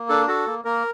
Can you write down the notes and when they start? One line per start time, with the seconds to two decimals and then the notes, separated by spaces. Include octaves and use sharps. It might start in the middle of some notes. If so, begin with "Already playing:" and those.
Already playing: A#3
0.09 D4 A4
0.28 F#4 A4
0.47 A#3
0.65 A#3 A#4